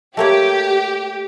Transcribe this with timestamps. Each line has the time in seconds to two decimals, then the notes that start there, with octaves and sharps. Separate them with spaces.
0.17 A3 A#3 G4 C#5